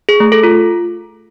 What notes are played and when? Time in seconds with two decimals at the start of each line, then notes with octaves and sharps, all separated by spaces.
0.09 G#4
0.20 A3
0.32 A4
0.43 F4